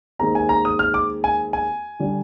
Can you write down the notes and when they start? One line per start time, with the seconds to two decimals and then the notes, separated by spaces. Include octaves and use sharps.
0.19 D#2 D#3 G#3 C4 A#5
0.35 G#5
0.49 A#5
0.65 D#6
0.79 F6
0.94 D6
1.24 G#5
1.53 G#5
1.99 D3 G3 D4